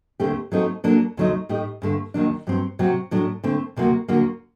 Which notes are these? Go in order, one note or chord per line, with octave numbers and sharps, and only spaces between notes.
D#2 D3 A3 C4 G4
F#3 A3 C4 D#4 A4
F#3 A#3 D4 A4
D2 C3 F#3 A3 D#4
A2 A3 D#4 G4
G2 D3 A3
D#2 D#3 F#3 A#3 D4
G2 F#3 C4
C3 F#3 C4 F#4
A2 F#3 A3 D4
D3 A3 C4
D2 C3 F#3 A#3 F#4
D#2 D3 F#3 A#3 F#4